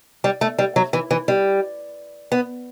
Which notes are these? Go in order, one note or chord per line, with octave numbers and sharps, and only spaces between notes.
G3
A3
G3
F#3
E3
E3
G3
B3